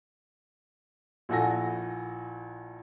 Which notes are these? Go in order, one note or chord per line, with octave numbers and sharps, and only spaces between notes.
A#1 E4 F#4 A4 G#5 A#6